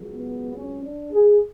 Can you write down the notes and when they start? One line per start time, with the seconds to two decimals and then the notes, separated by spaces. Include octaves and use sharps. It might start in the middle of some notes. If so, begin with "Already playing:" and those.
Already playing: C#2 C#3 F#3
0.11 B3
0.54 C#4
0.83 D4
1.12 G#4